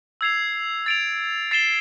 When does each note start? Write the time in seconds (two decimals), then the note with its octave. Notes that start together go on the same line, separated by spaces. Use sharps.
0.21 E6 G#6 C7 F7
0.86 A6 D7 F7
1.51 A6 C7 E7 G7